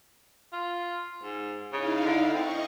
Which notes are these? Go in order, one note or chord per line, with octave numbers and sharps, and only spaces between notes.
F4
G#2
C#3 D#4 E4 F5
D3
C4 D#5 C#6